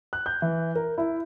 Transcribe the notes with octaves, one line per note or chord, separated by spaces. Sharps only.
F#6
G6
E3
A#4
E4